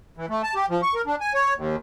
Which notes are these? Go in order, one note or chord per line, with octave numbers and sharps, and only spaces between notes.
E3
A3
A5
G4
F3
C#6
A#4
D4
G#5
C#5
D#2